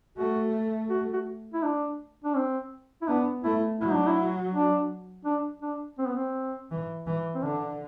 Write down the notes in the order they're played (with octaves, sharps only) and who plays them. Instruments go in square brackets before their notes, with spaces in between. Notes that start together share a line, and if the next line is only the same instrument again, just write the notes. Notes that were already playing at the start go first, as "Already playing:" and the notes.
[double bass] A3 [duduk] F#4
[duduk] F#4
F#4
E4
D4
D4
C4
E4
[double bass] B3 [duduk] D4
[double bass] A3 [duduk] E4
[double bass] F#3 [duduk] E4
[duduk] D4
E4
D4
D4
D4
C4
B3
C4
[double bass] E3
E3
[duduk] C4
[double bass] D3 [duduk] D4